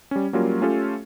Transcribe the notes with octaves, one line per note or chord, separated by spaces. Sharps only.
G3 C#4
F#3 G3 A#3 C#4 F4 A#4
A3 C#4 F4 G4 A4 C#5